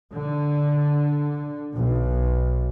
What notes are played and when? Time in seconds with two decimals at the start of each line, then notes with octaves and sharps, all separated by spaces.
0.12 D3
1.77 B1